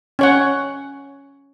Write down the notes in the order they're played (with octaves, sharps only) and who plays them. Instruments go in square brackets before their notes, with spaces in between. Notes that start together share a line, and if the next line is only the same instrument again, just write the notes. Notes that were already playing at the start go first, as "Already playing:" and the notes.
[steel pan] C#4 C#5 F#5